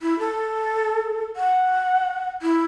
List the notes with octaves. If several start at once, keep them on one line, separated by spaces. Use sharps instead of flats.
E4
A4
F#5
E4